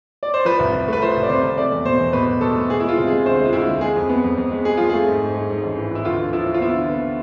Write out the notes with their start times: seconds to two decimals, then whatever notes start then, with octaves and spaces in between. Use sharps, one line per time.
0.23 D5
0.34 C5
0.45 F3 B4
0.59 C2
0.73 C2
0.88 A3
0.93 B4
1.02 F3 C5
1.16 C2
1.23 D5
1.29 C3 C5
1.43 C3
1.58 A3 D5
1.72 E2
1.85 B2 C5
2.00 E2
2.13 B2 B4
2.27 B2
2.41 B2 A4
2.55 A3
2.69 B3 G#4
2.80 E4
2.84 G#3 F4
2.98 C3
3.07 G#4
3.12 G#3
3.25 D2 C5
3.40 G#3
3.45 F4
3.53 D2 E4
3.67 G#3
3.81 G#3 G#4
3.96 F2
4.09 B3
4.24 F2
4.37 F2
4.51 G#3
4.65 G#3 G#4
4.77 F2 F4
4.90 A3 G#4
5.07 G#2
5.21 G#2
5.35 G#2
5.50 G#2
5.64 A1
5.77 E3
5.91 E3 E4
6.05 D2 F4
6.19 D3
6.33 F3 E4
6.47 F3
6.54 F4
6.61 B3 E4
6.75 D3
6.89 B3